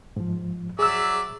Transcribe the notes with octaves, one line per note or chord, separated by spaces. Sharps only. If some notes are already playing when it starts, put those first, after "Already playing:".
G#2 F3
F#3 G#4 D5 E5 E6